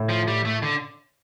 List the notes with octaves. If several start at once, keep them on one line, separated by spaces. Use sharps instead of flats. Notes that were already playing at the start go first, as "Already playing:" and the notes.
Already playing: A2
F3
G3
A3
D3